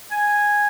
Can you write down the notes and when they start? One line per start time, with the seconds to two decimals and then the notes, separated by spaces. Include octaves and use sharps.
0.11 G#5